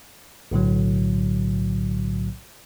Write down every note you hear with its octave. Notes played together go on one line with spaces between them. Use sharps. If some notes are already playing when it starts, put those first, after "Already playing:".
B1 A2 D3 F#3